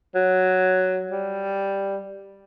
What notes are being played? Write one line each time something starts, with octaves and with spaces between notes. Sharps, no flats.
F#3
G3